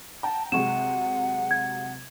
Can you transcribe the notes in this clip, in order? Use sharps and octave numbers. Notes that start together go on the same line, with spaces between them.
F#5 G5 A5 A#5
C3 F#3 G#3 F#5 G5 C#6 E7
G#6